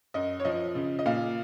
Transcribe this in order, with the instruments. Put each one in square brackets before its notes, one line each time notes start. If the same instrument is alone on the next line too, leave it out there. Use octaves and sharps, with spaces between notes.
[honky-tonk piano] F#2 D#5
C#5
F3 D#5
C#3
D#5
A#2 F5